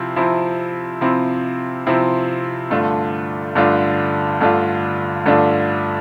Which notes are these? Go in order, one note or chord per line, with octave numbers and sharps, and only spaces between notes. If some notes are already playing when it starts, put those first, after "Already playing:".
Already playing: C3 F3 C4 E4
C3 F3 C4 E4
C3 F3 C4 E4
C3 F3 C4 E4
G2 D3 A3 D4 F4
G2 D3 A3 D4 F4
G2 D3 A3 D4 F4
G2 D3 A3 D4 F4